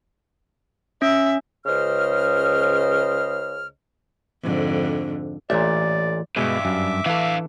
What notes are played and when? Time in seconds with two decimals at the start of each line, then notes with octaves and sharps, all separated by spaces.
1.02 C#4 E5
1.66 C#2 C#3 C5 D#5 F6
4.43 F2 G#2 D3
5.50 A1 A#2 E3 A3 D5 E5
6.36 C#2 G2 B2 G#3 E5 D6
6.65 F#2
7.06 E3 D4 A4 F5